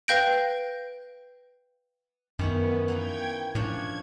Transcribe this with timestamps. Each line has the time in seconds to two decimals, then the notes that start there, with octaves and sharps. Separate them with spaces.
0.08 B4 F5 G5 G6 A#6 D7
2.39 F#2 D#3 B3 C#4 E4
2.88 E3 A#3 B3 G5 G#6
3.55 A2 F3 C#4 D4 G#6